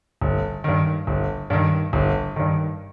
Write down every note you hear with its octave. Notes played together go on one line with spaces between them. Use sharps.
G1
G2 D#3
G1
G2 D#3
G1
G2 D#3